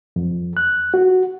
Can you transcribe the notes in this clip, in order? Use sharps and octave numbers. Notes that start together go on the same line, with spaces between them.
F2
F#6
F#4